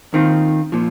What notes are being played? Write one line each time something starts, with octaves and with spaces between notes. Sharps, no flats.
D#2 D#3 C4 F4
A#2 F3